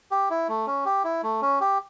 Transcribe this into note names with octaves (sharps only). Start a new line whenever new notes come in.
G4
E4
A3
C#4
G4
E4
A3
C#4
G4